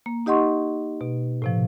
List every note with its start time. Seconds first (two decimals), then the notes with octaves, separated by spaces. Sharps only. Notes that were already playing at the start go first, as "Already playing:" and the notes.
0.06 A#3
0.26 D#4 G4 D#5 F#5 C6 C#6
1.01 B2
1.42 A2 C3 F3